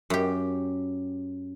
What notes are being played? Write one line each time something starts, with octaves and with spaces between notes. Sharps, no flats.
F#2 G4